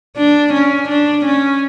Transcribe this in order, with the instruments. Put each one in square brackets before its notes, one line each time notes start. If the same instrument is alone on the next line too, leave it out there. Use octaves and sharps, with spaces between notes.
[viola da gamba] D4
C#4
D4
C#4